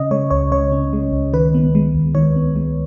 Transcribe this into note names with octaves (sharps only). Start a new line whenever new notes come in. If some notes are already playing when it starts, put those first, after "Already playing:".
Already playing: C#3 C#4 D#5
G#3 C#5
C#2 C#5
C#3 C#5
C#4
G#3
C#2
D#3 B4
B3
G#3
D#2
D#3 C#5
B3
G#3